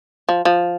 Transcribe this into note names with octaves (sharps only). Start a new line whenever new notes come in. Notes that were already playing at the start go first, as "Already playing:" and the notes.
F3
F3